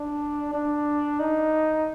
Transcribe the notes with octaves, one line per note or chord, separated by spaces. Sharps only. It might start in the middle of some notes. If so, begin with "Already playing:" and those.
Already playing: D4
D4
D#4